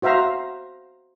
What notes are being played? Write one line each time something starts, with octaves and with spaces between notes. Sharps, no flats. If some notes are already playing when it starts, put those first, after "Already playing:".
F#4 C5 E5 F5 A#5